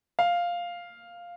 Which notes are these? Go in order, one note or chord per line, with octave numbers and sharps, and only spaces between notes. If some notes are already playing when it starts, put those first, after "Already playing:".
F5